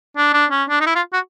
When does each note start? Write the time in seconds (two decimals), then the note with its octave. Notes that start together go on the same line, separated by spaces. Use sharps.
0.17 D4
0.33 D4
0.51 C#4
0.69 D4
0.81 D#4
0.86 E4
0.95 F4
1.13 F#4